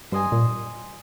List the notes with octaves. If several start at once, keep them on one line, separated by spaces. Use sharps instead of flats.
G2 C5 D#5 G#5
A#2